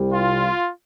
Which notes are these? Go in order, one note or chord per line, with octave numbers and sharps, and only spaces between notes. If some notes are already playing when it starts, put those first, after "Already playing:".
Already playing: C2 C3 G3
F4